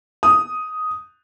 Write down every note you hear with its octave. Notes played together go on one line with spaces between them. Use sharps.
D#6